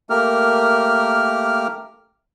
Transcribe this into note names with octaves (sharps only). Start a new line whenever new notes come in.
A3 A#3 G4 A#4 F6